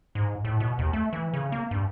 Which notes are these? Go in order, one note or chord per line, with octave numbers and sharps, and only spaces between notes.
G#2
A2
B2
D#2
A3
E3
C#3
A#3
G2